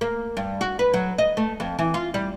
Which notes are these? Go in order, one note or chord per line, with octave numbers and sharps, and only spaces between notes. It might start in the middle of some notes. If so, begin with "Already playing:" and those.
A#3
G2
F#4
B4
F#3
D#5
A3
F2
E3
F4
G3